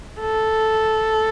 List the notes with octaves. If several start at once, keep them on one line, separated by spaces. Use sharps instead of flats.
A4